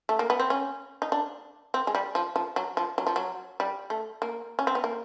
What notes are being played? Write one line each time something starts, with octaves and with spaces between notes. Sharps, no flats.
A3
A#3
B3
C4
C#4
D#4
D4
C4
G#3
G3
F3
F3
F#3
F3
F#3
F3
F#3
G3
A3
A#3
C#4
C4
B3
A#3